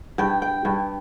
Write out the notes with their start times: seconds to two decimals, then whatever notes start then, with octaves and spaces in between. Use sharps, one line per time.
0.18 G2 G5
0.42 G5
0.65 G2